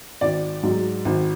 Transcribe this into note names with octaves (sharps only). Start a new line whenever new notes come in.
G#1 D5
G#2 F#3
G#1